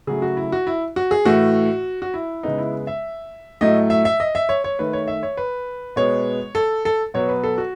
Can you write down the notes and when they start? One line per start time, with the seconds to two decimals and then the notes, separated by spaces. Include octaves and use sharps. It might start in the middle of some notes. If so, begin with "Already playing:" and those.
0.07 C#3 F#3 A3 G#4
0.22 F#4
0.37 E4
0.52 F#4
0.67 E4
0.96 F#4
1.11 G#4
1.25 A2 E3 A3 F#4
2.02 F#4
2.14 E4
2.43 C#3 G#3 B3 D#4
2.58 E4
2.87 E5
3.61 A2 F#3 A3 D#5
3.90 E5
4.05 E5
4.20 D#5
4.35 E5
4.49 C#5
4.64 C#5
4.79 D#3 A3 B4
4.93 C#5
5.08 E5
5.23 C#5
5.37 B4
5.96 B2 G#3 B3 C#5
6.55 A4
6.85 A4
7.14 B2 F#3 B3 C#5
7.29 B4
7.44 A4
7.58 F#4